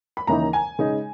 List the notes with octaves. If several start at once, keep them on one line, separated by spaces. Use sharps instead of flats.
B5
D#2 C#3 E3 A#3 D#4 A#5
G#5
C#3 G#3 D#4